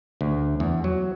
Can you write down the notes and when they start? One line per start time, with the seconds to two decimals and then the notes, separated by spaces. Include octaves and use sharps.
0.21 D2
0.60 E2
0.84 F#3